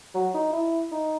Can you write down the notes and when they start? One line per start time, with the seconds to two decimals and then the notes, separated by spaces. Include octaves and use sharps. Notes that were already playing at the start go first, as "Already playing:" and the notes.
0.15 F#3
0.34 D#4
0.53 E4
0.91 D#4